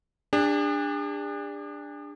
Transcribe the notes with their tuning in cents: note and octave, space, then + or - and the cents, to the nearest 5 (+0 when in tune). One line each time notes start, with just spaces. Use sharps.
D4 +0 G#4 -45